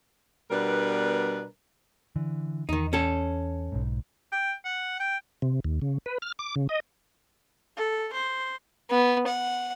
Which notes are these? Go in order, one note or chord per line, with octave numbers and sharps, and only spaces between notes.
B2 G3 B3 D4 A#4 B4
D3 E3
E2 D#3 D#4
C#4 A4
B1 G#2
G5
F#5
G5
C3
D#2
C#3
B4
F6
D6
C#3
D#5
A4
C5
B3
F#5